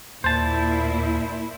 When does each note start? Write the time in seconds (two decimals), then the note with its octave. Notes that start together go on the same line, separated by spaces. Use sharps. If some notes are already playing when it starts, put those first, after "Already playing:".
0.24 D#2 A#2 A#3 E4 C5 A5